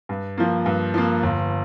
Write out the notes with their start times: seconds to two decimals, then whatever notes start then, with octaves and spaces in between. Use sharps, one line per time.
0.09 G2
0.38 F3 A#3
0.66 G2
0.94 F3 A#3
1.23 G1